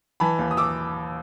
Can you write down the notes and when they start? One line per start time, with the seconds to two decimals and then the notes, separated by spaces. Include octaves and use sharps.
0.20 E3 A5 B5
0.39 D#2
0.51 D#6
0.57 D6 E6